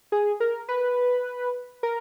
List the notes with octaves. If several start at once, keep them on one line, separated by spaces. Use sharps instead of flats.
G#4
A#4
B4
A#4